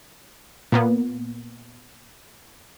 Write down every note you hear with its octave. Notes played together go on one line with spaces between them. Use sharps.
A#2 A#3 B3